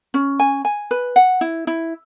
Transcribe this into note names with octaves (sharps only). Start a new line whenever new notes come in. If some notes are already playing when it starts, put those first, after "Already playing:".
C#4
G#5
G#5
B4
F#5
E4
E4